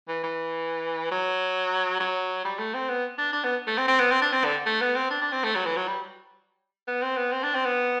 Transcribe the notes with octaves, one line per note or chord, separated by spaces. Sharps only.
E3
E3
F#3
F#3
G3
A3
C4
B3
D4
D4
B3
A3
C4
C4
B3
C4
D4
C4
D3
A3
B3
C4
D4
D4
C4
A3
F#3
E3
F#3
G3
B3
C4
B3
C4
D4
C4
B3